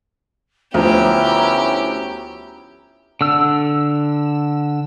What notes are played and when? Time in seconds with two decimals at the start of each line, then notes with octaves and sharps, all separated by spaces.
0.74 D2 F3 B3 C#4 E4 G4 A#5
3.21 D3 E6